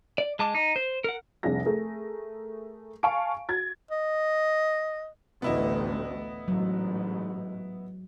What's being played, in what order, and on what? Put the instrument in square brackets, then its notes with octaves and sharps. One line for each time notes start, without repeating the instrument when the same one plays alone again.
[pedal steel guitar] D5
G#3 A5 D6
D#4
C5
A#4 F#5
[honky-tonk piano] F1 C2 D4 G#4 A#6
A3 G#4 A#4
F5 G#5 A5 C#6 D7
F#4 G#6 A6
[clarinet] D#5
[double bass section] A1 D2 A2 [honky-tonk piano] B3 E4 D#5
[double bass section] A1 G#2 [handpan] F#3